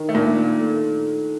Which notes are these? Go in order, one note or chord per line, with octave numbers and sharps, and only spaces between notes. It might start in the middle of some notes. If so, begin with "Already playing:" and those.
Already playing: D#3
A3
A#2 A#3 D4
F4
A3